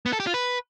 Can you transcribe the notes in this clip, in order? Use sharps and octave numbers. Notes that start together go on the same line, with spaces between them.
B3
A4
G4
F4
B4